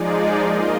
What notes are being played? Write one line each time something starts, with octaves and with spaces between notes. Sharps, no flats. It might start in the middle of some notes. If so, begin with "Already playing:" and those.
Already playing: F3 G#3 D#4 G#4 D5
A#3 F4 A#4 D#5